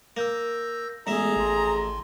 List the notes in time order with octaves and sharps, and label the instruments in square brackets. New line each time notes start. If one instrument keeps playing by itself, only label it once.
[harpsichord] A#3 [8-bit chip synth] E6 G6 A#6
[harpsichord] A1 E5 [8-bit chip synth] G#3 B3 [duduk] G#4 [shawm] A#5
[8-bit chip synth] G#1 C6